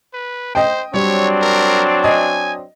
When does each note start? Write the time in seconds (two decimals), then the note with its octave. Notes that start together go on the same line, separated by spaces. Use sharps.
0.13 B4
0.55 C5 D#5 G5
0.94 F#3 G3 C4 D4 C#5
1.42 A#4
2.04 D#5 G#5